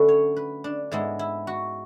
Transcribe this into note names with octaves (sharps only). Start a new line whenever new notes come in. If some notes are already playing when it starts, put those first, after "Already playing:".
Already playing: D3 F#3 A3 C#4 A4 B4
C#5
B4
D4
G#2 G#3 B3 E4
E4
F#4